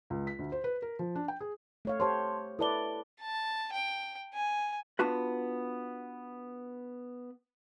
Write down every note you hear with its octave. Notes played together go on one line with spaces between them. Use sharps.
C#2
B6
D2
C5
B4
A#4
F3
D4
G5
G#4
A3 C#5 F5
G4 C5 C#5 A5 C6
E4 A4 B4 D5 A5 G7
A5
G5
G#5
B3 D4 F4 F#4 B4